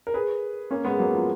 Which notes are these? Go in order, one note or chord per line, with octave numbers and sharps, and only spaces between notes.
A#4
G#4 B4
A#3 C#4
G#3 B3
F#3 A#3
F3